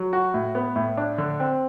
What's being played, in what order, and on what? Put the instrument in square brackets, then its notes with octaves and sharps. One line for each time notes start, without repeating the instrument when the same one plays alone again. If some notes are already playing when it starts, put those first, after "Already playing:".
Already playing: [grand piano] F#3
F#4
A2
B3
A2
D4
D3
C4